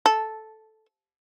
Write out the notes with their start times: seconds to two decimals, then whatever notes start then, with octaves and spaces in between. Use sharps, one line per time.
0.06 A4